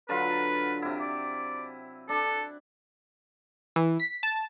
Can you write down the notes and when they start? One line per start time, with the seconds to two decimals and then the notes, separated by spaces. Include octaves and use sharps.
0.09 D3 F#3 F4 B4
0.82 C3 E4
1.00 D5
2.09 D4 A4
3.76 E3
4.00 B6
4.23 A5